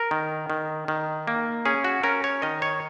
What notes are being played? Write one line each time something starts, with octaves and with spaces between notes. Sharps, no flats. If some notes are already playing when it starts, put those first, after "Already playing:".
Already playing: A#4
D#3
D#3
D#3
A#3
C#4 G#4
F#4
C#4 A#4
C#5
D#3 D#5
C#5